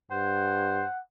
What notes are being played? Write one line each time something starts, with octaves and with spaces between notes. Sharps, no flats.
G2 C5 F#5